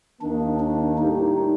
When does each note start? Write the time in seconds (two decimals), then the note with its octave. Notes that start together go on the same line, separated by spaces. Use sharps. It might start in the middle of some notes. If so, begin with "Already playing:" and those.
0.22 D#2 D#3 A#3 D4
0.60 D4
0.97 A2 G3 D4 D#4 G4